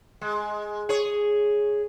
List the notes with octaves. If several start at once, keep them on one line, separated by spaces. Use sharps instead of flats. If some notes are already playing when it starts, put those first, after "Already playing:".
G#3
G#4 C#5